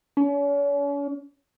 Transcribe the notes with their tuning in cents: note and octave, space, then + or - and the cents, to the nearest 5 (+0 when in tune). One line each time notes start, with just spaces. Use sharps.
C#4 +40